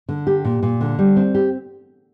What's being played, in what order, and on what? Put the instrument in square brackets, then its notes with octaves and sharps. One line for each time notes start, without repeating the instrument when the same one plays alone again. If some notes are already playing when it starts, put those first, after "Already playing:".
[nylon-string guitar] D3
G4
A#2
A#2
D3
G3
C4
G4